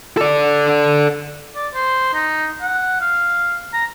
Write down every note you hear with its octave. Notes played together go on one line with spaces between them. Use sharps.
A4 D5
D5
C5
D#4
F#5
F5
A#5